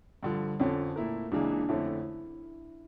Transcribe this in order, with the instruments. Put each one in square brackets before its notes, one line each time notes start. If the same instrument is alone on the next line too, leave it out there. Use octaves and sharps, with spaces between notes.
[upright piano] G2 D3 F3
[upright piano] F2 D3 F3 [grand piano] C#4
[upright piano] A#2 A3 E4 A#4
[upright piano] C#2 C#3 E3 A#3 [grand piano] D4
[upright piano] F2 D3 A3 C#4 [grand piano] E4